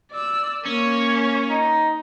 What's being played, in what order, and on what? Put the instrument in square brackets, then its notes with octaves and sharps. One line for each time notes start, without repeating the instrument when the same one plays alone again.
[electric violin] D5 E6
[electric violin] A#3 C#5 [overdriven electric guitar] C#4
[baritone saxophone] D#4